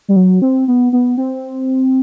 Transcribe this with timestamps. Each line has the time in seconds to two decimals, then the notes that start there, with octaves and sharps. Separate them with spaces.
0.08 G3
0.16 F#3
0.42 C4
0.68 B3
0.93 B3
1.18 C4